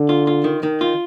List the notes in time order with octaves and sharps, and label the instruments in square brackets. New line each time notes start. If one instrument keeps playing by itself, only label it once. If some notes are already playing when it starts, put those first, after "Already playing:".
Already playing: [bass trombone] D3
[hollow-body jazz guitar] F4
F4
D#3
D#3
F4